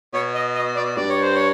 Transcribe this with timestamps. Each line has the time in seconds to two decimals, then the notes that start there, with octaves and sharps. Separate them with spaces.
0.13 B2 C#5
0.35 D#5
0.55 D#5
0.76 D5
0.96 G2 D5
1.09 C#5
1.22 C5
1.34 C#5